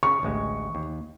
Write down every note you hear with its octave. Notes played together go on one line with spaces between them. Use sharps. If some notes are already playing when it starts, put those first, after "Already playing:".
C#3 C#6
A1 D2 G#3
D#2